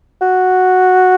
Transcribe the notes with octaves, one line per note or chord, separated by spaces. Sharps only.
F#4